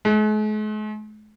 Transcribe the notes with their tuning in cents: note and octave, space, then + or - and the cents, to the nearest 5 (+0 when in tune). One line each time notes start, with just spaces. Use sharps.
G#3 +45